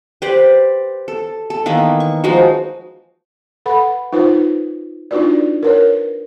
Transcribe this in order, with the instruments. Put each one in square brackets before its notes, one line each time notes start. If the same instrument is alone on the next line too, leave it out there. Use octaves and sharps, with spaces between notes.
[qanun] G4 B4 C5 D5
A4
A4
D#3 E3 A#3 B3
C#6
F3 G#3 D#4 F#4
[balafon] A4 B4 F#5 B5
D#4 F4 B4 C5
D4 D#4 F4 F#4 B4 D5
A#4 B4 C#5